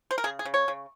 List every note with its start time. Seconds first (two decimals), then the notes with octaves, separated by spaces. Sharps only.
0.11 C5
0.18 A#4
0.24 C#3 G#4
0.39 G#4
0.45 C#3
0.54 C#5
0.68 C#3